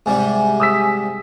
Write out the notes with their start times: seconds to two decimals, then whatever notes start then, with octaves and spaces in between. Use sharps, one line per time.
0.06 G#2 C3 G3 G#5
0.60 D#6 E6 B6